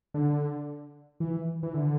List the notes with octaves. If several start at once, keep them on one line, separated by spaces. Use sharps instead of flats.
D3
E3
E3
D3